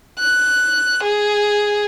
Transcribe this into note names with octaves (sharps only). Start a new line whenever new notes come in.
F#6
G#4